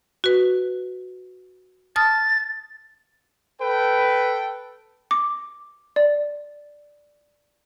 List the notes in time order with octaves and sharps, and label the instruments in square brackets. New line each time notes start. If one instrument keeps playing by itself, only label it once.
[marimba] F#4 B4
[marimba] A5 D#6 F6 [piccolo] A6
[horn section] A4 G5 [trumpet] B4
[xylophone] D6
D5